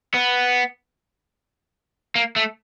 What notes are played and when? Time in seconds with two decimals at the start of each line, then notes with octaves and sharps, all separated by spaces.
0.14 B3
2.16 A#3
2.36 A3